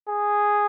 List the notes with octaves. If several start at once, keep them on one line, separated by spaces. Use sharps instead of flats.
G#4